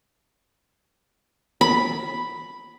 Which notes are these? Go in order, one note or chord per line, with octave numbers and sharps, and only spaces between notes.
B5